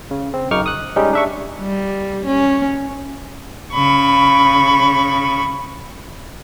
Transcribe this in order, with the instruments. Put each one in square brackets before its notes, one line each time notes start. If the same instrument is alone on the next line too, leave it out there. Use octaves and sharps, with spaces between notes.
[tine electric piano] C#3
C4
F#2 C#3 D#4 C#6 D6 F6
D#6 F#6
G3 G#3 C#4 D#4 G4
D4 E5 C#6
[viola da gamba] G3
C#4
[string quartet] C#3 B5 C#6